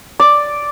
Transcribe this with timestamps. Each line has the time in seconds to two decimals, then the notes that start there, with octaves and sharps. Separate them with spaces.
0.20 D5